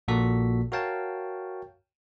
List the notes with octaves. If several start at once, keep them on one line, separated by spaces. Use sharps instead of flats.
A#1 A#2 F#4 A4 B6
F#4 A#4 C#5 F5 G5 A5